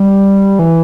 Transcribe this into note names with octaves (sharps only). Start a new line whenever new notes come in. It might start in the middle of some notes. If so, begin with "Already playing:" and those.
Already playing: G3
E3